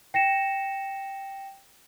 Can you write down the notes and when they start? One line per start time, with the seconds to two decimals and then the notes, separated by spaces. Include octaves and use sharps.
0.14 G5 A#6 C#7 E7